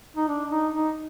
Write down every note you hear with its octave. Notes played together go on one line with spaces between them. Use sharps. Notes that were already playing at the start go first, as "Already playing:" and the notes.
D#4
D4
D#4
D#4